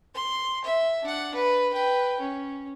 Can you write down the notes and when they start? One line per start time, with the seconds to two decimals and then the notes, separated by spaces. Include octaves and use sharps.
0.14 C6
0.64 E5
1.03 D4 F#5
1.35 B4
1.73 B4 G5
2.20 C#4